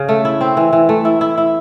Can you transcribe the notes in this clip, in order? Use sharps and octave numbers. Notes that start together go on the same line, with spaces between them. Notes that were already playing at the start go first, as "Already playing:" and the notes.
Already playing: C#3
A3
E4
C4
E3
E3
A3
E4
E4
E4